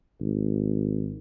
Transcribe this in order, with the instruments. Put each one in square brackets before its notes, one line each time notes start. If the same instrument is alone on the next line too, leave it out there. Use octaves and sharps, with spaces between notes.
[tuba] G#1